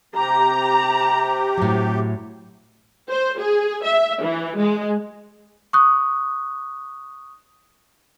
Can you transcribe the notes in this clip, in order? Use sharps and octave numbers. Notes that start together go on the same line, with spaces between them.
C3 G4 A#5
A2 F#3
C5
G#4
E5
E3
G#3
C#6 D#6 F#6